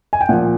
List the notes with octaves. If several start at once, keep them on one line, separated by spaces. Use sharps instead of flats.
G#5
G5
A#2 F3 F#5